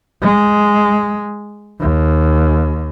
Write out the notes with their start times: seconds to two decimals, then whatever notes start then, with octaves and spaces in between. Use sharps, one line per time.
0.22 G#3
1.80 D#2